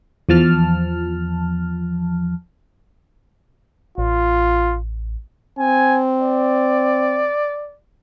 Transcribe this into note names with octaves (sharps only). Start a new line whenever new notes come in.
E2 F3 A5 F6
A1 F4
C4 G#5
D5